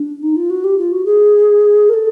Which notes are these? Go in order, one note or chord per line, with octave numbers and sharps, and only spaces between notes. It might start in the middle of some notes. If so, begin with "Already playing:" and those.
Already playing: D4
D#4
F4
F#4
G4
F4
F#4
G#4
A#4
A4